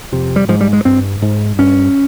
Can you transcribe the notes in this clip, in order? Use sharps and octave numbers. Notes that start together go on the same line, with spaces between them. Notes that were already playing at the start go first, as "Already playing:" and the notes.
F2 C3
G3
G#2 F3
G3
G#3
G2 C4
G#2
G2 C#4